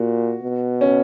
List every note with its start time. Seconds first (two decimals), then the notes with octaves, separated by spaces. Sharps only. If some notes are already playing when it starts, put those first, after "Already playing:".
Already playing: A#2 F#4
0.42 B2
0.81 C#4